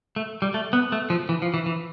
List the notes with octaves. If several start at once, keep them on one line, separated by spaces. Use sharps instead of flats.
A3
G3
A3
B3
A3
F3
E3
F3
E3
E3